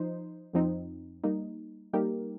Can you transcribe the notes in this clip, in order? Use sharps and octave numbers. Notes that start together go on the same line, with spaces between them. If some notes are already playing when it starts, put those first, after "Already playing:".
Already playing: F3 D#4 C5
F2 F3 C4 D#4
G3 A#3 D#4
G3 A#3 D#4 G4 A#4